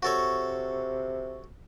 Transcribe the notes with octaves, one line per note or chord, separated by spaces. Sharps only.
C3 F#4 A4 C#5